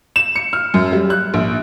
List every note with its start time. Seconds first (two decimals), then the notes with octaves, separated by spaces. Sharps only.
0.16 E7
0.36 C#7
0.53 F6
0.74 F#2
0.93 G3
1.10 F#6
1.34 A#1